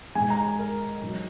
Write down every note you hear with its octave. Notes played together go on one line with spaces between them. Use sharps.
G#2 G#3 G#5
A#5
A#5
A#4
G#2 F#3